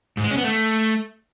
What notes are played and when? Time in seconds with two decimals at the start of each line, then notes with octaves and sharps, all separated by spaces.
0.17 G#2
0.24 G#3
0.31 C#4
0.37 B3
0.44 A3